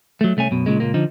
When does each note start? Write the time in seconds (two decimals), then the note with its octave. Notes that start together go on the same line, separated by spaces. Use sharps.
0.21 F#3 A3
0.37 C2 A3 C#4 G#5
0.51 F#2 B2
0.66 A#2 C#3 G#3
0.80 C#2 A#2 A#3
0.94 D3 F3 D#4